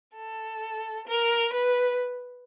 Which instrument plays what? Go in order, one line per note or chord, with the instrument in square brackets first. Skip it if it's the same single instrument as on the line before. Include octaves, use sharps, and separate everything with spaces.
[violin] A4
A#4
B4